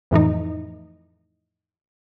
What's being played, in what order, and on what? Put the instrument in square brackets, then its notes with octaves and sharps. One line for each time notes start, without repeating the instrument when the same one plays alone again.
[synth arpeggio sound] F2 A2 E3 D#4